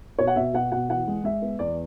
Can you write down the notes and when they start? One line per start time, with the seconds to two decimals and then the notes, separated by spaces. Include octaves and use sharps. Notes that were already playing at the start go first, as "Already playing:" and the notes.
0.19 B2 C#5
0.27 F#5
0.36 B2 E5
0.54 B2 F#5
0.72 B2 F#5
0.89 E3 F#5
1.07 G#3
1.24 G#3 E5
1.42 B3
1.59 E2 D5